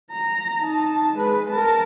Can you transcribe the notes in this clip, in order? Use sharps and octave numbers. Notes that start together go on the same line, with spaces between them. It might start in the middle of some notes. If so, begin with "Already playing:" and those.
A#5
D#4 A5
G#3 B4
A#4 A5